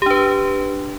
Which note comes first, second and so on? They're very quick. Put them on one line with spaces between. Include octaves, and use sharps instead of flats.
G4 D4 B4